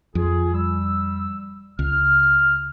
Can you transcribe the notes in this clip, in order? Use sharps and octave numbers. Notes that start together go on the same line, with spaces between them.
F2 F4 G#4
G3 E6
C#2 F6